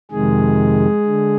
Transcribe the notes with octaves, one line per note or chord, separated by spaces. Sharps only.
F2 C3 D#3 G#3 G#4
D3